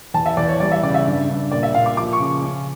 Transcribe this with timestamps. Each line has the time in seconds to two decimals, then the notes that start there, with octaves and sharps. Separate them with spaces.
0.14 E2 A5
0.26 E5
0.37 E2 D5
0.49 C#5
0.60 G3 D5
0.72 E5
0.83 C#3 D5
0.94 E5
1.06 G2
1.29 G2
1.52 A#2 D5
1.63 E5
1.74 A#2 F5
1.86 D6
1.97 F3 D6
2.13 C#6
2.20 C#3
2.43 C#4